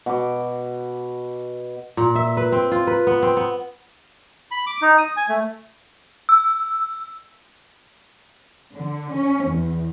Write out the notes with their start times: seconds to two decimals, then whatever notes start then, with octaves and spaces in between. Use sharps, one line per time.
0.06 B2 D6
1.97 A#2
2.15 E5
2.37 B4
2.52 C4
2.72 F4
2.87 B4
3.07 B3
3.23 C4
3.37 B3
4.51 B5
4.67 D6
4.82 D#4
4.98 D#6
5.17 G#5
5.29 A3
6.29 E6
8.74 D3
9.13 C#4
9.49 E2